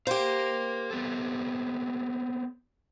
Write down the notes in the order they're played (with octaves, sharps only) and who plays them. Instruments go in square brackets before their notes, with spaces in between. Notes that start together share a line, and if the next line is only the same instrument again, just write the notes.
[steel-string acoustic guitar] G4 C5 [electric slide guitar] A#4 F5
[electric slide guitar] B3 C4 A4